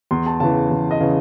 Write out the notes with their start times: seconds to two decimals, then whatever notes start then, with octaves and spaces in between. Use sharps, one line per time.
0.11 E2 C6
0.26 A5
0.40 C#3 E3 A5
0.70 E2
0.91 D#5
1.01 C#3 E3